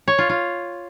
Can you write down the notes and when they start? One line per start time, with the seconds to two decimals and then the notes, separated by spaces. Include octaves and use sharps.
0.08 C#5
0.18 F4
0.29 F4